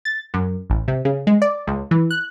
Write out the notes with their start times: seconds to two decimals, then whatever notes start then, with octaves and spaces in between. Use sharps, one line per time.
0.05 A6
0.34 F#2
0.70 A1
0.88 C3
1.05 C#3
1.27 G#3
1.42 D5
1.67 C#2
1.91 E3
2.11 F#6